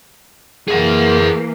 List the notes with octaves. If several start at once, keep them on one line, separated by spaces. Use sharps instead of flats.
E3 A#3 G#4 F#5